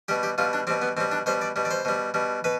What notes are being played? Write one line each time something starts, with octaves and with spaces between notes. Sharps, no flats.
B2 G3 G4
G4
B2 G3 F4
D4
B2 G3 C4
B3
B2 G3 C4
D4
B2 G3 C5
D5
B2 G3
D5
C5
B2 G3
B2 G3
B2 B4